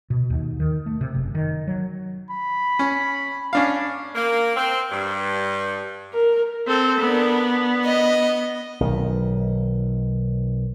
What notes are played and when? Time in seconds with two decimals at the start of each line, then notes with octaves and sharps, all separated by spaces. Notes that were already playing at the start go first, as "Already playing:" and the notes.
0.10 B2
0.30 D#2
0.60 D#3
0.86 A3
1.01 C3
1.15 F#1
1.35 D#3
1.67 F#3
2.30 B5
2.79 C#4
3.53 C#4 D4 F5
4.15 A#3
4.56 C4
4.92 G2
6.13 A#4
6.67 C4 A4
7.00 B3 D4 A#4
7.85 D#5
8.80 B1 D#3